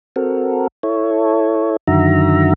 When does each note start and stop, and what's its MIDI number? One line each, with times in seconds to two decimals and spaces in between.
0.16 0.67 60
0.16 0.67 66
0.16 0.67 69
0.16 0.67 70
0.83 1.76 64
0.83 1.76 69
0.83 1.76 73
1.87 2.53 42
1.87 2.53 50
1.87 2.53 51
1.87 2.53 66
1.87 2.53 76
1.87 2.53 82